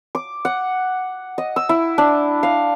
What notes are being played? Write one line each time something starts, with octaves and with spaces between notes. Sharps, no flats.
D6
F#5
D#5
E6
E4
D4
F5